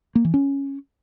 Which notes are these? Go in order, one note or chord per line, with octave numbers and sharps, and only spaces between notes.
A#3
E3
C#4